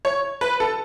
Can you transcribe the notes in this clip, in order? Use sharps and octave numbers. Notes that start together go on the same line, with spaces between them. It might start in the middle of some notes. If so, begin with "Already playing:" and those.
C#5
B4
A4